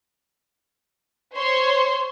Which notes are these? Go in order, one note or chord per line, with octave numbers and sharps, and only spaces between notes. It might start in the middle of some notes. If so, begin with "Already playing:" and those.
C5 C#5 C6